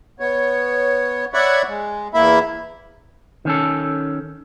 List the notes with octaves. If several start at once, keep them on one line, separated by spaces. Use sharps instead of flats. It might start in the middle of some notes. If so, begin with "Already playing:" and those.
B3 C#5
C#5 D5 E5 F#5 B5 C#6
G#3
E2 A#3 E4 E5 B5
D#3 C#4 A4